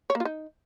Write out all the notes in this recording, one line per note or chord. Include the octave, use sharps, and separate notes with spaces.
C#5
A#3
F4
D#4